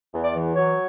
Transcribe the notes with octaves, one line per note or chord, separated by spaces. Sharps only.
E2
D5
E3
F#3 C#5